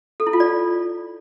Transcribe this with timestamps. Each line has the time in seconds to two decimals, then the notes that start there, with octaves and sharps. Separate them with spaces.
0.20 A4
0.27 E4
0.33 F4
0.40 D5